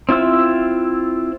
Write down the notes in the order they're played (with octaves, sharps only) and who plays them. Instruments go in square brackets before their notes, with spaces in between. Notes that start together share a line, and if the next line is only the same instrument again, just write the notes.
[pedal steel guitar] C4 E4 F4 E6